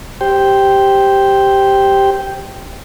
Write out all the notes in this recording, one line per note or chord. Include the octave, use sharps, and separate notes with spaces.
G4 C5 G5